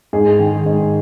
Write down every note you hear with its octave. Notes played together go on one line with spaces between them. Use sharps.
G#2 G#4
D#3
G#2